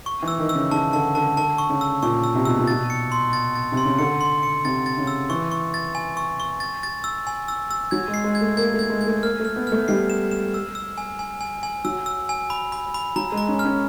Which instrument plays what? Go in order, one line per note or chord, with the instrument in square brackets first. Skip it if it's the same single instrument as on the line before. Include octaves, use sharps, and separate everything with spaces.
[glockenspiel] C#6
[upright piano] E3
[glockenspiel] E6
[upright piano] D#3
[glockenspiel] E6
[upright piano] C#3
[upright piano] C#3 [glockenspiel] A5
[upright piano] D3 [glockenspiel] A5
[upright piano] D3 [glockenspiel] A5
[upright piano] D3 [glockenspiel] A5
[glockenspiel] C#6
[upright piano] C#3
[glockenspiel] E6
[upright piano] A#2 [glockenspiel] C#6
[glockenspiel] E6
[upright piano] C3
[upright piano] B2 [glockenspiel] E6
[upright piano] A#2
[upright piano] B2 [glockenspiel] A6
[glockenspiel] C#7
C6
A6
A6
[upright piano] C3
[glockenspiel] C6
[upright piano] C#3
[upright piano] D3 [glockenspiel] C#7
[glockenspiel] C6
C#7
[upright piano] C3 [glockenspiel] A6
[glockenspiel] A6
[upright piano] C#3
[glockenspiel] E6
[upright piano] E3 [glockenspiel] C#6
[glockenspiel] C#6
A6
G#5
C#6
C#6
A6
A6
E6
G#5
E6
E6
[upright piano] F#3 [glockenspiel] G#6
[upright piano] G#3
[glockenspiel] C7
[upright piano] G#3
[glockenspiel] G#6
[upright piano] A3
[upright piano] A#3 [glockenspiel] G#6
[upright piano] A3
[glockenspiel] G#6
[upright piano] G#3
[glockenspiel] G#6
[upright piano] A3
[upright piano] A#3 [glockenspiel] F6
[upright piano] A3
[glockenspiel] F6
[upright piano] B3
[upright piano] A3 [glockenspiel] F6
[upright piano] G3 [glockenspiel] C7
[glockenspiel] E7
E7
E6
E6
G#5
G#5
G#5
G#5
[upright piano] F#3 [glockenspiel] E6
[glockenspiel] E6
G#5
B5
B5
B5
[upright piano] F#3 [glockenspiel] A#5
[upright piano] G#3
[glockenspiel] A#5
[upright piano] C#4
[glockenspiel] F6
[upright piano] C#4